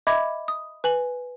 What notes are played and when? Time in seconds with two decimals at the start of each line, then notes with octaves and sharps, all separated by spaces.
0.07 D#5 E5 B5 D6 G#6
0.48 D#6
0.84 B4 G#5 F#7